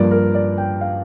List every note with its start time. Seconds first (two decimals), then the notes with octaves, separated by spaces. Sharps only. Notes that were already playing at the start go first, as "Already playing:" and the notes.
Already playing: G2 F3 A#3 D5
0.11 A#4
0.35 D5
0.58 G5
0.81 F5